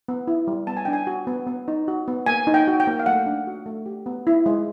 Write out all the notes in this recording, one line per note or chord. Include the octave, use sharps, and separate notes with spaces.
B3
E4
G3
B3 A5
G#5
D4 G5
G#5
F#4
B3
B3
D#4
F#4
B3
A#3 G#5
D#4
G5
F#4
G5
A#3
F5
A3 F#5
D4
F#4
A3
G4
B3
E4
G#3